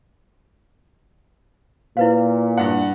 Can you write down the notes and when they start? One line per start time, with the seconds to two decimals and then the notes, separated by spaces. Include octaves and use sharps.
1.97 A#2 E4 B4 F5
2.58 G2 F#5